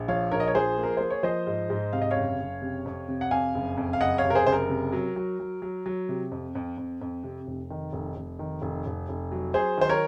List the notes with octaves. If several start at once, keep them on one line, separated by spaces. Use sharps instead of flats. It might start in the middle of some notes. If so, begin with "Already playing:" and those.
Already playing: A#1
F3 C#5 F5
A#1 A#4 C#5
D#5
C#5
F3 G#4 C5
A#3
A#4
A#3 C5
C#5
F3 C5 D#5
G#2
G#2
C3 F5
D#5
C#5 F5
F#1
F#1
C3
F2
C3
F#5
F2 F5 G#5
F#1
F2
F5
F#1 D#5 F#5
C#5 F5
C3
A#4
G#4 C5
F#1 C5
A#4
C3
F#3
F#3
F#3
F#3
F#3
C3
F2
F2
F2
F2
C3
F1
D#3
F1
F1
D#3
F1
F1
F1
F#3
F#3 G#4 C5
D#3 C5
A#4 C#5